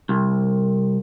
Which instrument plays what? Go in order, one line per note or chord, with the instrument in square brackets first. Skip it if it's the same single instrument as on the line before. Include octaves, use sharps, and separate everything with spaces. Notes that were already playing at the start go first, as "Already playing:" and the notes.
[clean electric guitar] C2